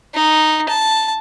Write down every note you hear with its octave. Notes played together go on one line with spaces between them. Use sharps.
D#4
A5